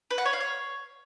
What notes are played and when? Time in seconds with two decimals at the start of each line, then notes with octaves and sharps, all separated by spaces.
0.11 B4
0.18 F#5
0.25 C#5
0.33 F5
0.40 C#5